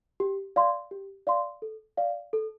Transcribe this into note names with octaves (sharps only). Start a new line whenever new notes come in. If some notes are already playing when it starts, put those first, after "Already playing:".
G4
D5 F5 C6
G4
D5 F5 C6
A4
D5 F5
A4